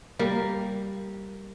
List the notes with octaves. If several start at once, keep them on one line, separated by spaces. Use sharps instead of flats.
G3 A#3 A#4